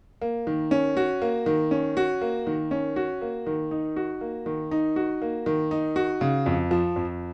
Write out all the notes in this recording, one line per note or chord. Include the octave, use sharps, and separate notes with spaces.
A#3
D#3
C#4
F#4
A#3
D#3
C#4
F#4
A#3
D#3
C#4
F#4
A#3
D#3
D#4
F#4
A#3
D#3
D#4
F#4
A#3
D#3
D#4
F#4
C#3
F2
F3
F2